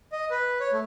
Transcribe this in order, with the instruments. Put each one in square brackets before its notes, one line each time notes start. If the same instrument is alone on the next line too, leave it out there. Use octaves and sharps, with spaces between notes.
[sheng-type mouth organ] D#5
B4
C#5
A3